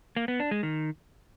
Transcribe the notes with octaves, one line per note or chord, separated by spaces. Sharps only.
A#3
B3
D4
G#3
D#3